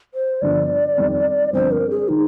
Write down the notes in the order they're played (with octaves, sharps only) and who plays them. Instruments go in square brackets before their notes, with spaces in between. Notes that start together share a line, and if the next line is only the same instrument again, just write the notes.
[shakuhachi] C5
[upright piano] G1 G2 D3 F3 [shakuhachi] D5
[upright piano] F2 D#3 G3 C4
[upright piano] G2 D3 F3 C4 [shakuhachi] C5
[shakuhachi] A#4
G#4
[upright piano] D#3 [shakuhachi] D#4